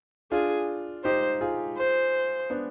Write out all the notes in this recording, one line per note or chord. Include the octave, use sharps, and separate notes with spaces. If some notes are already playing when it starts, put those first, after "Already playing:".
D4 F4 G#4
D#4 G4 C5
F4 G#4
C5
B3 D4